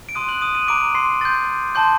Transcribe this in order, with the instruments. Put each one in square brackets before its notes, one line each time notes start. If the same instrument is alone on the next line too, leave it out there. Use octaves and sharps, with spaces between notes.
[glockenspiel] D7
C6 D#6 F#6 D#7
F#6 F#7
D#6 D#7
D#6 D#7
A#5 D6 F#6 D7
C6 C7
C6 G6 A6
A5 C6 G6